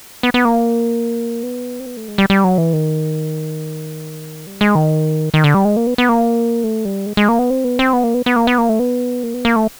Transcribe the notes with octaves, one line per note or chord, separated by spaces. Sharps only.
B3
B3
A#3
B3
C4
B3
A3
G#3
G3
G3
F#3
E3
D#3
G3
G#3
D#3
D#3
D3
G3
G#3
A#3
B3
B3
A#3
A3
G3
G#3
G#3
A#3
B3
C4
B3
C4
B3
A#3
B3
B3
A#3
B3
A#3
A3
B3
A#3
B3
A#3
A3